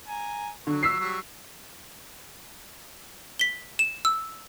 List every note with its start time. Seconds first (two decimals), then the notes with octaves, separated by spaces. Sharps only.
0.08 G#5 A#5
0.67 D3 F#3 C#6
0.83 E6 B6 C7
1.00 F#3 G3 C#6
3.39 B6 G7
3.79 E7
4.05 E6